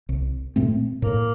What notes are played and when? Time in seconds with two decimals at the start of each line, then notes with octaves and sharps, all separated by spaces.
0.09 C2
0.56 A#2 A3 C4
1.02 A2 A#3